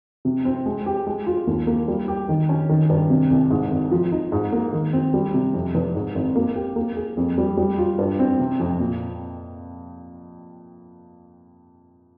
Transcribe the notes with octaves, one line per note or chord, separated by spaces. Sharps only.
C3
C4
G#3
G4
G#3
F4
D#2
A#3
G3
G4
D#3
C#4
D#3
G2
C3
C2
G#2
G#1
F3
D#4
G#2
A#3
D#3
C4
G3
C3
F2
F1
G#2
G#1
A#3
G4
A#3
G#4
F2
G3
G3
F4
G2
C4
C3
F2
A#2